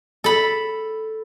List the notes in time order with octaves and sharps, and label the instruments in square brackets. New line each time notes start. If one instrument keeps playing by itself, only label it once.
[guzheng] A4 B5